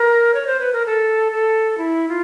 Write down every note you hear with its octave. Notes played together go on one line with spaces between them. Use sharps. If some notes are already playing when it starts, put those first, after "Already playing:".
Already playing: A#4
C#5
C5
B4
A#4
A4
A4
E4
F4